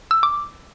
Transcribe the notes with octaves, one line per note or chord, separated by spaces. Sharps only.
E6
D6